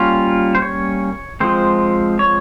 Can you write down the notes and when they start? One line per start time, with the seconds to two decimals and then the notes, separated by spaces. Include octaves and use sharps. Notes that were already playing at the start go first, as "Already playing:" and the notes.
Already playing: G3 A#3 C#4 F4
0.55 C5
0.62 C#5
1.40 F3 G#3 C4 C5
2.19 C#5